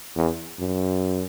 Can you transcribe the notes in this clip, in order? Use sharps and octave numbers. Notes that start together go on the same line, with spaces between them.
E2
F#2